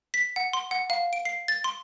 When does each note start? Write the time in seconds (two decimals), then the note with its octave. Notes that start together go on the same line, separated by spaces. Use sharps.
0.14 B6
0.36 F#5
0.53 C6
0.71 F#5
0.90 F5
1.13 D7
1.25 C7
1.48 A6
1.64 C6